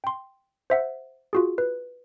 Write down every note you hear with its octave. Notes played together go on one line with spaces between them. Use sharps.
G5 C6
C5 E5 F#5
F4 F#4 G#4
B4